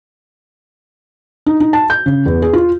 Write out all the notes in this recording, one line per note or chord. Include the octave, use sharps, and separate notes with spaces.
D#4
D#4
A5
G6
C#3
E2
G#4
F4